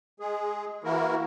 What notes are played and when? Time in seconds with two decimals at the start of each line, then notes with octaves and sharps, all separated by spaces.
0.20 G#3 G#4
0.84 E3 A#3 E4 F#4 A#4